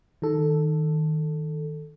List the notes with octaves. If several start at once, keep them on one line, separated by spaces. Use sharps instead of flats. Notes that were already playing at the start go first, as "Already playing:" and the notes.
D#3 A4